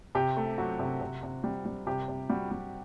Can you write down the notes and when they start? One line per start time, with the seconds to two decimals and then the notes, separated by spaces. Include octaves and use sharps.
0.15 C3 G4
0.37 A3
0.58 F#3 F#4
0.79 C3
1.01 C3
1.23 C3
1.44 G3
1.66 G3
1.87 C3 G4
2.08 C3
2.30 G3 F#4
2.51 G3